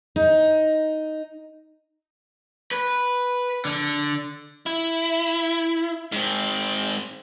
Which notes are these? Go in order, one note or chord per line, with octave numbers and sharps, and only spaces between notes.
D#4
B4
D3
E4
G#2 C4